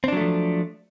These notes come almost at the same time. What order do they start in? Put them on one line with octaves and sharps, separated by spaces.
C4 D4 F#3 A3 F3